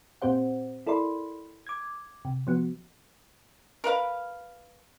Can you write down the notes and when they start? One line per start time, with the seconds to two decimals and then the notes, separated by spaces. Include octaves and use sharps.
0.22 A#2 C4 G4 C5 F#5
0.87 E4 A4 A#4 D5 B5 C6
1.67 D6 G#6
2.25 C3
2.47 F3 B3 F#4
3.84 A#4 B4 F5